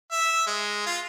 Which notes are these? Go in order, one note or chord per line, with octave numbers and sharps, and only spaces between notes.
E5
G#3
F4